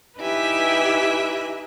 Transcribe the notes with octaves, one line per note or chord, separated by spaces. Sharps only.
D#4 E4 G4 B4 E5 G#5